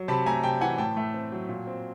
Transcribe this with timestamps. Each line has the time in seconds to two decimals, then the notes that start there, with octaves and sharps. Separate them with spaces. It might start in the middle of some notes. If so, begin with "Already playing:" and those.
Already playing: F#3
0.08 C3 A5 B5
0.26 A3 G#5 A#5
0.43 C3 G5 A5
0.61 E3 F#5 G#5
0.78 A2 G5 A5
0.97 A3
1.14 C4
1.32 F#3
1.49 A#2
1.67 C4